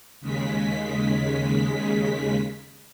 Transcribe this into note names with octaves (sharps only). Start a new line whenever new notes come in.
D#2 C#3 G#3 B6